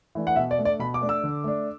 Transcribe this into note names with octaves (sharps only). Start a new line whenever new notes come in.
E3 A3 D4
F#5
B2 E5
D5
A3 D4
D5
B2 B5
D6
A3 D4
E6
D3
A3 D4